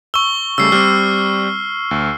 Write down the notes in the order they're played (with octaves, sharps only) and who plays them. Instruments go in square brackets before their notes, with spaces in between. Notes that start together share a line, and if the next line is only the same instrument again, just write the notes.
[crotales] C#6 G7 [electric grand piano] E6
[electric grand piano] C#3 G3 A3 [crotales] E6 C7
[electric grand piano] G3 C4 [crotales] F6
[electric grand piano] D2